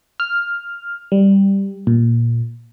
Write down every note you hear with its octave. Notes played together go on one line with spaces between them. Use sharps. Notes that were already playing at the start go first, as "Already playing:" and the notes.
F6
G3
A#2